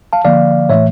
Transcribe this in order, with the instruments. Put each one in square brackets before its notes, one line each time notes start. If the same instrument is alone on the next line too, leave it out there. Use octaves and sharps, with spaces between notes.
[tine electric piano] F5 A5
D3 F3 A#3 D5 F5
A2 E3 A3 C#5 E5